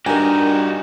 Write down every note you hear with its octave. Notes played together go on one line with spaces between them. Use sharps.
G2 D#4 F#4 G4 A#4 G#5